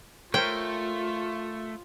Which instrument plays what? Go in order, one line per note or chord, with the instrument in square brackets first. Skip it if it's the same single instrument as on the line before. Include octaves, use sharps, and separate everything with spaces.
[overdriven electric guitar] A3 [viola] F4 [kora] A#4 C5 C#5 [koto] G5